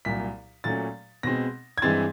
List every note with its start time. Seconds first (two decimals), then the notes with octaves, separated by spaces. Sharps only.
0.05 C2 A#2 F#3 B6
0.64 A#2 F#3 A3 C#4 A6
1.23 B2 G#3 C4 A#6
1.78 G#6
1.82 G2 E3 G#3 C4 A6